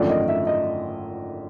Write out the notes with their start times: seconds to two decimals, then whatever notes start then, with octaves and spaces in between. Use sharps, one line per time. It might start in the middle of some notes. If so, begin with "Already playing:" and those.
Already playing: G#1 F#2 D3 F3 A3 D5
0.10 D#5
0.29 E5
0.47 D#5